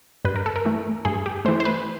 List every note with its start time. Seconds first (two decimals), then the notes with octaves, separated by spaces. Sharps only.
0.25 G2 B4
0.36 A#4
0.46 A4
0.56 A#4
0.65 E3 A3
1.05 G2 G#4
1.26 G4
1.45 E3 A3 C5
1.60 C5
1.65 B4